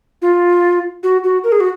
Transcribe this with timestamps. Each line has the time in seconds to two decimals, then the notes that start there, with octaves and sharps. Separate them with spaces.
0.22 F4
1.03 F#4
1.24 F#4
1.44 A#4
1.52 G#4
1.60 F#4